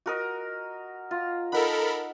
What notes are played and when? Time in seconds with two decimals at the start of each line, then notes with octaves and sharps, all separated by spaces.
0.06 F#4 A#4 D#5
1.11 F4
1.52 D#4 A4 A#4 F#5 B5